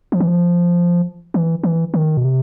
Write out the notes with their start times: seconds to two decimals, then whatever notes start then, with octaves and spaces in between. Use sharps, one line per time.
0.12 F3
0.20 E3
0.28 F3
1.34 E3
1.63 E3
1.94 D#3
2.17 B2
2.24 C3